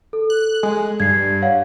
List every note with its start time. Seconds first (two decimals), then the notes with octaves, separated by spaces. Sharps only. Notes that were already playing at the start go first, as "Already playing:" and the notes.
0.13 A4
0.30 F#6
0.63 G#3
1.00 G2 G#6 C7
1.42 C#5 F5 F#5